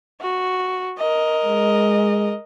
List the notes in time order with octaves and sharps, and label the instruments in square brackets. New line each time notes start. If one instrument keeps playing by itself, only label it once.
[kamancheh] F#4
A#4 D#5
[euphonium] G#3